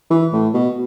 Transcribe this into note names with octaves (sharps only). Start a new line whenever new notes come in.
E3
A2
B2